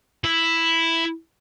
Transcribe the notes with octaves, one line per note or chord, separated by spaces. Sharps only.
E4